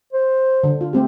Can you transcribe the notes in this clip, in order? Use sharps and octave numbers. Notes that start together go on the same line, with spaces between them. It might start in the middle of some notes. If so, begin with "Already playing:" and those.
C5
D3
F4
A3 C4 G4